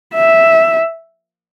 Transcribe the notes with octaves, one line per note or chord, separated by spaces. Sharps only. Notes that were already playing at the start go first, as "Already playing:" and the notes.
E5